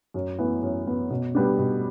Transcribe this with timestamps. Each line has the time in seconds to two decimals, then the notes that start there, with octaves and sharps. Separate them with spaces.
0.14 F#2
0.39 E3 B3
0.63 F#2
0.87 E3 B3
1.10 B2
1.35 G3 B3 D4
1.59 B2